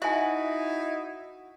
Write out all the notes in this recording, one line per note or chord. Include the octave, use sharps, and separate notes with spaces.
D#4 E4 F#4 E5 G#5